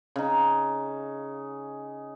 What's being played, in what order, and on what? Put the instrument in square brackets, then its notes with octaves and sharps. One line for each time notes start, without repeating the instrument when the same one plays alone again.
[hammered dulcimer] C#3 D#4